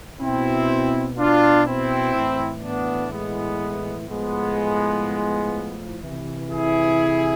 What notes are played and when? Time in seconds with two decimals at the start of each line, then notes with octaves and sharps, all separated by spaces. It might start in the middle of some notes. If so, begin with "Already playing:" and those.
0.21 B2 C4 E4
1.18 D4 F4
1.66 C4 E4
2.15 A2 E3
2.63 B3 D4
3.12 G#3 B3
4.08 A2 F3 G#3 B3
6.02 C3 E3
6.51 E4 G#4